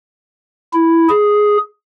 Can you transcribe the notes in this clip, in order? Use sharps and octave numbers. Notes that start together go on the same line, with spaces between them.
E4
G#4